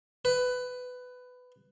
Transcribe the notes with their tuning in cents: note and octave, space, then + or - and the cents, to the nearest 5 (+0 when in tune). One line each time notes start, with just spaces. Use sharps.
B4 +15